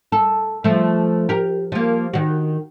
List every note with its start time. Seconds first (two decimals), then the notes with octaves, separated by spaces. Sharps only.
0.12 A4
0.64 F3 A3
1.29 G4 A#4
1.72 F3 A#3
2.13 D#3 F#4